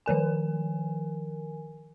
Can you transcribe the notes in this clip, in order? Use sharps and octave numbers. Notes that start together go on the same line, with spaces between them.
D#3 F3 A#4 G#5